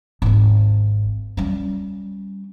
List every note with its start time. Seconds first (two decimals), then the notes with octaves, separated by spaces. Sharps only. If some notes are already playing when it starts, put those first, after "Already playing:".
0.22 G#1 D#2
1.37 G3 C#4